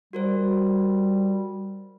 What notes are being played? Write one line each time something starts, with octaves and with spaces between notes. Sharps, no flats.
G3 F#4 A#4 C5